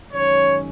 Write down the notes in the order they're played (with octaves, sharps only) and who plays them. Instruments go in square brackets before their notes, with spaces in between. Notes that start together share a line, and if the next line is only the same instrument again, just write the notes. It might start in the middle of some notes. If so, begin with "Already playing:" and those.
[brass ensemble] F#2 D#3 G#3 C#4 C#5